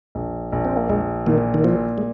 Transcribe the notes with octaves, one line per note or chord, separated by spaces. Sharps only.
A#1
A#1
C4
A#3
A#1 G#3
A#2 D#3
D#3
A#2 F3
G#3